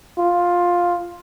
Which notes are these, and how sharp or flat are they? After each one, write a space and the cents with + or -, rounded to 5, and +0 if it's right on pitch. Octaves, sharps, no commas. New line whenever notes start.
F4 +10